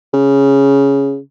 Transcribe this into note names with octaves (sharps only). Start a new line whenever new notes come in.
C#3